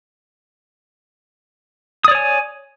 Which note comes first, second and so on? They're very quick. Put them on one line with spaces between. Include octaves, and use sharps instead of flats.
D#6 D5 C#5 G#5